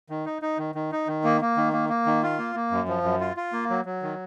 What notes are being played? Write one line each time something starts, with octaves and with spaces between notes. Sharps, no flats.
D#3
D#4
D#4
D#3
D#3
D#4
D#3
A#3
A#3
D#3
A#3
A#3
D#3
F4
A#3
A#3
F#2
F3
F#2
F4
F4
A#3
F#3
F#3
D#3